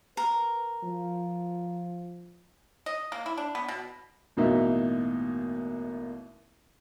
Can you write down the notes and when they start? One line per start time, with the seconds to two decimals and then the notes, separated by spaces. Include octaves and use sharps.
0.17 A#4 B4
0.84 F3
2.86 D#5
3.12 A#3
3.26 E4
3.38 D4
3.55 B3
3.68 B2
4.37 A1 B2 A#3 D#4 E5